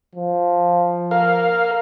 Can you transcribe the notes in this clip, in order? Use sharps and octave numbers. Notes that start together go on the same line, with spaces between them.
F3
A#4 F5